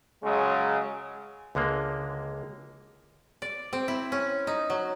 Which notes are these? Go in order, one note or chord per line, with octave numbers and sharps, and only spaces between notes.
C#3 F#3 G#3
C#2 D3 G#3 A#3
D5
C4
E4
C#4
D#4
F#3